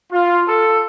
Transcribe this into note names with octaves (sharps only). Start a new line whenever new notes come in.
F4
A4